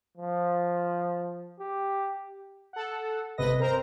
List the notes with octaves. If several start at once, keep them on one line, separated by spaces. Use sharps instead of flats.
F3
G4
A4 F#5
G1 C3 B4 D#5 A#6
C4 A#4 C5 A#5